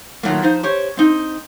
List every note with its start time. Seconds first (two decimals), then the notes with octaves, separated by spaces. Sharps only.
0.23 A#2 D#3 F3 F#3 A3 A#3
0.42 F3 D#4 C5
0.63 G4 C5 C#5
0.97 C4 D#4